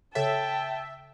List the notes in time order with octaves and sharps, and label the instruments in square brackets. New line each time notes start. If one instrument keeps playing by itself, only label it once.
[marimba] C#3 A4 C#5 [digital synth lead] E5 [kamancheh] G5 A5